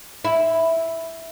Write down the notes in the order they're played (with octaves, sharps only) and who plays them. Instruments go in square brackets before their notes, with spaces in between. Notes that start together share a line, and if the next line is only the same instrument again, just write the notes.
[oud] E4